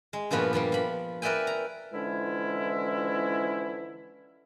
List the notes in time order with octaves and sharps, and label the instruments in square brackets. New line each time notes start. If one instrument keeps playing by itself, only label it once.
[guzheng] G#3
G2 A#2 F3 B3 F#4
G2 F3 G3 A#3
F3 B5
A#4 B4 D5 E5 G5 G#5
A#5
[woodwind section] D3 E3 F3 G#3 C#4 E4